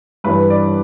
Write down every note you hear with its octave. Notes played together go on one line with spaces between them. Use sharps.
G2 E3 G3 B4
D5